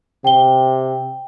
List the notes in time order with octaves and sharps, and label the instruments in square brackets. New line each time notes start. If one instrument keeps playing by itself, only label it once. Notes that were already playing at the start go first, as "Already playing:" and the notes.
[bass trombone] C3 [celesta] G5 G7